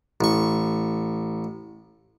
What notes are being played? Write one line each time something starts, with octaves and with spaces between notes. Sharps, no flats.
A1 C#6